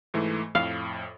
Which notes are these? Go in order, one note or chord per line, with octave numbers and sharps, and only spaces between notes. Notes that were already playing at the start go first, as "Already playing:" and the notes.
G#2 E3 A3
F2 A2 F5